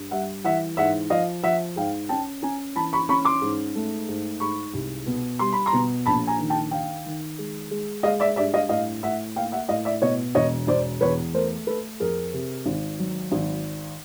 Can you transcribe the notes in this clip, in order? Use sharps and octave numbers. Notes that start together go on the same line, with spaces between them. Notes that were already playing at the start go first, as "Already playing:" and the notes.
Already playing: G2
G3 E5 F#5
E3 E5 F#5
G#2 E5 F#5
F3 D#5 F5
F3 E5 F#5
G#2 F5 G5
C#4 G5 A5
C#4 G#5 A#5
E3 A5 B5
B5 C#6
C#4 B5 C#6
C6 D6
G#2
A3
G#2
G#2 B5 C#6
C2
B2
G3 C6
B5
A#5 C6
B2
A#1 A5 B5
G#5 A#5
D#3
G5 A5
D#3 F5 G5
D#3
G#3
G#3
G#3 D#5 F5
D5 E5
G2 D5 E5
D#5 F5
A2 D#5 F5
A2 E5 F#5
A#3 F5 G5
E5 F#5
A2 D#5 F5
D5 E5
B2 C#5 D#5
E1 C#5 D#5
E1 C5 D5
E2 B4 C#5
A3 A#4 C5
A3 A4 B4
F2 G#4 A#4
C3
G#1
F#3
G#1